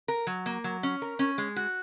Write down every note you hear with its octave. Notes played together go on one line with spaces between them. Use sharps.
A#4
F#3
A#3
F#3
C#4
A#4
C#4
G#3
F#4